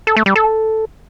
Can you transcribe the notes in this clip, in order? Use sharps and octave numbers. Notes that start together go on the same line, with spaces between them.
A4
A3
G3
A4